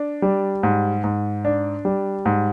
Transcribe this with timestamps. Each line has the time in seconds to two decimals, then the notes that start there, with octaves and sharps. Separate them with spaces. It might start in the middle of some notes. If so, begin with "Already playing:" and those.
Already playing: D4
0.22 G3
0.63 G#2
1.04 G#2
1.45 D4
1.85 G3
2.25 G#2